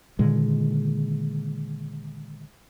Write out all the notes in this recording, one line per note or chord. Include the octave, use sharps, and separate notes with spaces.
A#2 D3 D#3 G#3